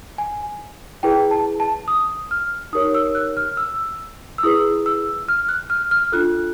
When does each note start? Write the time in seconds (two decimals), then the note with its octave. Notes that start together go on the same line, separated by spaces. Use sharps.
0.18 G#5
1.03 E4 G#4 B4 G5
1.31 A5
1.60 A5
1.88 D#6
2.31 F6
2.73 D#4 G4 A#4 C#5 D#6
2.94 E6
3.15 F#6
3.37 F6
3.57 E6
4.38 E6
4.43 E4 G#4 B4 D#6
4.86 E6
5.28 F6
5.49 F#6
5.70 F6
5.91 F6
6.12 D4 F4 A4 F#6